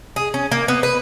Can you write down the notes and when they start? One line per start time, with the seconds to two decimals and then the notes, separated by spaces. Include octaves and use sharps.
0.16 G#4
0.34 C#4
0.51 A#3
0.68 B3
0.83 B4